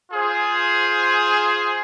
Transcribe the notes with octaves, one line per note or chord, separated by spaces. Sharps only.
F4 G#4 C5